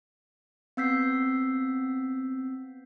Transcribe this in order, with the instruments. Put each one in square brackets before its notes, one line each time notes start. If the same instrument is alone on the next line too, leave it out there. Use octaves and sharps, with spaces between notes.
[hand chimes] B3 C4 E6 G6 B6 C7